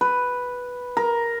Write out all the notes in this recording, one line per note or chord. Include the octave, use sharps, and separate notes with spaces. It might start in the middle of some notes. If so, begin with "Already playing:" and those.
B4
A#4